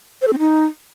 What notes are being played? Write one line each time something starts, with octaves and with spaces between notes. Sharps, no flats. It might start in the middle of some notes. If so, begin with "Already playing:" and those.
C5
A4
C4
D#4